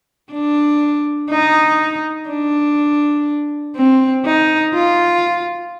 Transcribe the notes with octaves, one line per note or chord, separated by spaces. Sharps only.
D4
D#4
D4
C4
D#4
F4